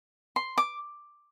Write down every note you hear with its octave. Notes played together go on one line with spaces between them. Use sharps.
C6
D6